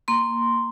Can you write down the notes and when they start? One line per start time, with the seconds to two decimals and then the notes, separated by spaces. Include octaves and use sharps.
0.08 A#3 C6